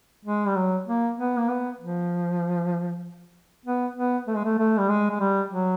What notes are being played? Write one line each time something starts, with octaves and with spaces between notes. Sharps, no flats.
G#3
G3
F#3
A#3
B3
A#3
B3
F3
B3
B3
A3
G#3
A3
A3
G3
G#3
G#3
G3
F#3